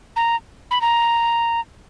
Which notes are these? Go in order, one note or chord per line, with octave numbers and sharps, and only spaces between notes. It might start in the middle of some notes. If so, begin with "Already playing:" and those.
A#5
B5
A#5